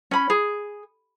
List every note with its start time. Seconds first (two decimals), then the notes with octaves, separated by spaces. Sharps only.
0.11 C#4 B5
0.30 G#4